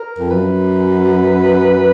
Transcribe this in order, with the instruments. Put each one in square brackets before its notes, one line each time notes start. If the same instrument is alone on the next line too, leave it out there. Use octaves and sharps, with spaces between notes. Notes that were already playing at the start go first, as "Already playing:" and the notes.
Already playing: [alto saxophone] A#4
[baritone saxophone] F2
[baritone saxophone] F#2 [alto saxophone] B4